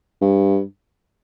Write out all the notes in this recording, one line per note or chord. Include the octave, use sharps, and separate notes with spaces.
G2